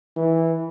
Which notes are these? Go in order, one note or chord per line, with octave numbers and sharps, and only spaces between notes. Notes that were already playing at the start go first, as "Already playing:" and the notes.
E3